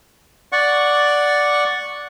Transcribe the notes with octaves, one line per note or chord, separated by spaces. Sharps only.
D5 F#5 C#6